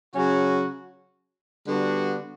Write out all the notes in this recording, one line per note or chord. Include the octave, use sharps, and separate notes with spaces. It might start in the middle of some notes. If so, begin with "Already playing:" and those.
C#3 F#3 C#4 F#4
D3 G3 B3 D4 F#4